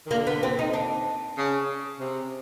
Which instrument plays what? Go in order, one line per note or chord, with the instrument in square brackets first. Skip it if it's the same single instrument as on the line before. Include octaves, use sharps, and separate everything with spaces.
[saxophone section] D#3
[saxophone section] D3 [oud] A#3
[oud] B3
C4
D#4
D4
[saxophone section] C#3
C3